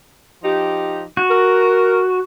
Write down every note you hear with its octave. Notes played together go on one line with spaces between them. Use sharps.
F3 D#4 G4
F#4
A#4